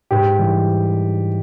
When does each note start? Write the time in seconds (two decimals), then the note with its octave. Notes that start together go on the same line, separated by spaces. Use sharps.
0.11 G#2 G4
0.39 E3 G3